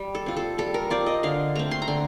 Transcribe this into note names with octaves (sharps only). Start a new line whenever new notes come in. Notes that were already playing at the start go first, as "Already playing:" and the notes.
Already playing: G3
A4
C4 F4
A4
G3 A4
A#4
C4 F4 D5
D#5
D3 F5
A3 C4 A#5
C6
A#5
D3 C6